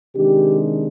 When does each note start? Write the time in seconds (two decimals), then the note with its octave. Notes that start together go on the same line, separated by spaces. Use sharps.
0.16 C3 D#3 G#3 D4 G4